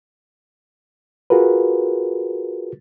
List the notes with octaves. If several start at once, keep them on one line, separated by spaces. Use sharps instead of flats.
F4 F#4 G#4 A#4 B4